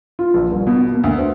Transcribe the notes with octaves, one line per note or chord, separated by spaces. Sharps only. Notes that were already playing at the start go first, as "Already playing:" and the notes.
F4
A#1
D#1
B2
A#3
D2
C5